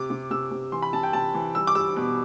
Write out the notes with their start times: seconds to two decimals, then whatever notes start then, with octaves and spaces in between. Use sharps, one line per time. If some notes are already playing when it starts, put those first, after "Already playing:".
Already playing: C3 D6
0.10 C3
0.31 C3 E6
0.51 C3
0.72 E3 C6
0.82 B5
0.93 C3 A5
1.03 G5
1.13 C3 A5
1.34 E3
1.55 G3 E6
1.67 D6
1.75 G3 E6
1.96 B2